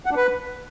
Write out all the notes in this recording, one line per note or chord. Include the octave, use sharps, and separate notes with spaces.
F#5
D4
B4